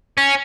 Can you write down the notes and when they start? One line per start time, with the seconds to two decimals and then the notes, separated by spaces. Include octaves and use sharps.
0.17 C#4